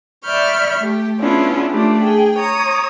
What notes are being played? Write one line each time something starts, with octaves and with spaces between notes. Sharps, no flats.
D5 E5 B5 C#6 F6 G6
A3 G4
B3 C#4 D4 E4 F4 G#4
A3 D4 F4 G4
G#4 G5
C#5 A#5 D#6